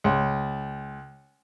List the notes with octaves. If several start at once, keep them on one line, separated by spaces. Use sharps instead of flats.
C#2